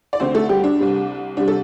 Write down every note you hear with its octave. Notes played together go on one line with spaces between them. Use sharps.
D5
D2 D3 A3 C4 C5
A3 A4
G3 G4
D4
C2 C3 G3
C2 C3 G3 D4
A4